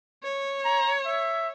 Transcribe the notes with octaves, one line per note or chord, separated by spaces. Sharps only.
C#5
A#5
E5